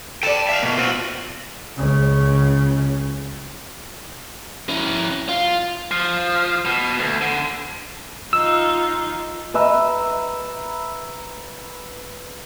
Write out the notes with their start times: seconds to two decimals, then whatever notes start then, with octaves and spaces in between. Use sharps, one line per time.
0.23 A4 D5 G5 A5
0.49 E5 F5
0.62 B2 A#3
0.77 C4 F4 F#4
1.77 C#2 C#3
4.69 C#4 E4
5.29 F4
5.91 F3
6.65 B2
6.99 D2
7.21 D3
8.33 D#4 F4 E6
9.54 B4 E5 A#5